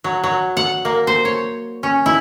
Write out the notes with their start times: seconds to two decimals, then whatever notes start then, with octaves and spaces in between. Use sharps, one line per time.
0.04 F#3
0.24 F#3
0.57 F#5
0.85 A#3
1.07 C5
1.25 C#5
1.83 C#4
2.06 E4